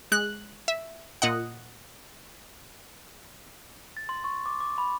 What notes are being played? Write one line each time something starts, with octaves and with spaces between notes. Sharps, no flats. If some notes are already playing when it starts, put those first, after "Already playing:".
G#3 F#6
E5
A#2 D#5 F#5
A6
C6
C#6
D6
D6
B5